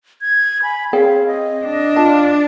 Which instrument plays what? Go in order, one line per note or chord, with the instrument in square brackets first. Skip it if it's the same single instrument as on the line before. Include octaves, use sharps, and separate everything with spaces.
[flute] G#6
[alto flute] G#5 [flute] B5
[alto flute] C4 [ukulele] G#4 C#5 G5 [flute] F5
[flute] D#5
[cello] D4
[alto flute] F4 [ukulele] A5